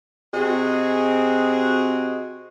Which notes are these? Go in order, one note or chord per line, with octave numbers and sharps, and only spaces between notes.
C3 C4 F#4 G#4 D#5